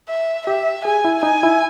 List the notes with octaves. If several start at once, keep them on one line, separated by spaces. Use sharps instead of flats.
E5
G4 E5
G#4 G#5
E4
D#4 G#5
E4